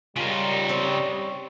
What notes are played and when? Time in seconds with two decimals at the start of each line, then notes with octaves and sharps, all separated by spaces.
0.16 C#3 G3 D#4 F4 A#4
0.69 C4 C#5